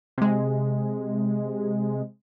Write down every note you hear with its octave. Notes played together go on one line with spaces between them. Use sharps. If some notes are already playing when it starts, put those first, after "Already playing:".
C3 G#3